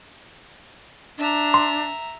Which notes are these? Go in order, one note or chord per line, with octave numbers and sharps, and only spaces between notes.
D4 E5 A#5
C6